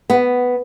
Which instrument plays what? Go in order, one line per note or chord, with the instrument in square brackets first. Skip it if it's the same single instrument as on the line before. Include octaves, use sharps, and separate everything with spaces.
[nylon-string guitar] B3